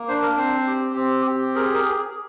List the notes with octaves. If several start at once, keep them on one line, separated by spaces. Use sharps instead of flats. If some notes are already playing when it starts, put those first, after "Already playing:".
Already playing: A#3
D4 C5
A#4
C4 C5
G4
C4
G4
G#4 A#4
A#4
G#4
G#4